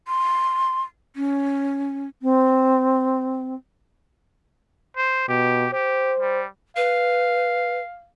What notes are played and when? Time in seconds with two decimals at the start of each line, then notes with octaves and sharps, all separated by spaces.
0.08 C6
1.16 C#4
2.22 C4
4.97 C5
5.29 B2 G4
5.73 G4 C5
6.20 G3
6.77 B4 F5